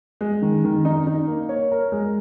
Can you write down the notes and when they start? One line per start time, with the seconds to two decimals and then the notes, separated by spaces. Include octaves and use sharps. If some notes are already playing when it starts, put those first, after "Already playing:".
0.21 G#3
0.42 D#3
0.64 D#3
0.85 D#4
1.07 D#4
1.28 A#3
1.49 C#5
1.72 A#4
1.92 G#3